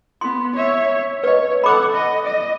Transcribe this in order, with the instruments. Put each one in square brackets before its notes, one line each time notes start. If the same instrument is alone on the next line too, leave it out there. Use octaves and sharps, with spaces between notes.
[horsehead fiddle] B3 [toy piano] C6
[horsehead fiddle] C#5 E5
[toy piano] B4 D#5 [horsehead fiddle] C#5
[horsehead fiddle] A4 F#5 [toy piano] B5 D6
[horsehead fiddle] D#5
D#5